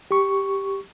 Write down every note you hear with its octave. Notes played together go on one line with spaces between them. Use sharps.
G4 C#6